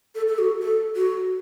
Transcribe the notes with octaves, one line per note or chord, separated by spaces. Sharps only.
A4
A4
F#4
A4
F#4